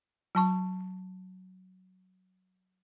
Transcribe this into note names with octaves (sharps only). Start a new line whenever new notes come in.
F#3 A5 C#6